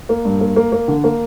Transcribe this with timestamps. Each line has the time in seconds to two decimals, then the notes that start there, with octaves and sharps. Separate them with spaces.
0.09 A#3
0.25 G2
0.41 A#3
0.56 A#3
0.72 A#3
0.88 D3
1.04 A#3